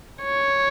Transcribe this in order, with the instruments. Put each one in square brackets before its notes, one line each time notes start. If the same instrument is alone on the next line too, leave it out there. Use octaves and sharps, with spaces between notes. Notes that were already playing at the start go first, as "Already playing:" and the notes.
[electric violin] C#5